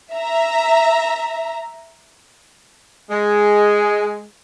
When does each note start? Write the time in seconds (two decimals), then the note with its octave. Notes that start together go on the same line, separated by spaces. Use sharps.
0.14 E5 A#5
3.10 G#3